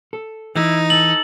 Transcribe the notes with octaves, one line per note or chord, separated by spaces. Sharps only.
A4
E3 D#4 E4
A4 F#7